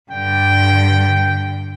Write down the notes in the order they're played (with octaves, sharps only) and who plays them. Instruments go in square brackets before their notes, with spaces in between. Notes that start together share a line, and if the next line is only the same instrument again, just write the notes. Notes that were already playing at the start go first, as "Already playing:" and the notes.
[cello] G2 D3 [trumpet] G5